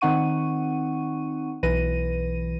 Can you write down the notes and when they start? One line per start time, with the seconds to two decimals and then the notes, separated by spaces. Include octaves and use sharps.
0.01 D#3 C4 D#4 F#5 C#6 D#7
1.63 B1 E3 B4 A#6 D#7